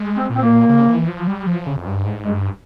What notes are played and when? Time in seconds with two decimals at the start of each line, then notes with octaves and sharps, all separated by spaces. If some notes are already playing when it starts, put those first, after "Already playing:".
Already playing: G#3
0.17 C4
0.30 A#2
0.36 C4
0.43 A#3
0.69 C#3
0.89 E3
1.08 F3
1.27 G3
1.47 F3
1.67 C#3
1.77 F2
1.87 G2
2.06 G#2
2.25 G2 G#3